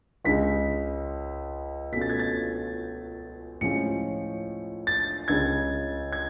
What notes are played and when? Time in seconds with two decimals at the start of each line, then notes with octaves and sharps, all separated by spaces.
0.24 C#2 C#3 G#3 B6
1.92 B2 A3 C#4 F4 B6
2.01 A6
2.09 G#6
2.19 A6
3.61 A2 F3 G#3 C#4 F4 C#7
4.87 A6
5.28 C#2 C#3 G#3 G#6
6.12 G#6